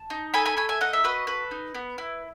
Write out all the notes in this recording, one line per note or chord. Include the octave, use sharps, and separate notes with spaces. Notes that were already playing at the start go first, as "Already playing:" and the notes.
Already playing: A5
D#4
A4 G#5 B5
G#5 B5
A3 G#5 B5
E5 G#5
D#4 D#5 F#5
E5
F#4 B4 D#5
A4 B4
D#4
B3
E4